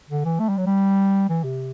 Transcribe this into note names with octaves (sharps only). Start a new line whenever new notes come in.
D3
E3
A3
G3
F#3
G3
E3
C3